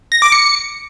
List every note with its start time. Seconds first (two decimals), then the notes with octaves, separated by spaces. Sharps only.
0.12 A#6
0.22 D6
0.32 C#7